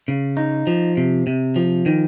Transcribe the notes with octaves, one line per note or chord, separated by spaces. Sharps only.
C#3
D#4
F3
C3
C3
F3
D#3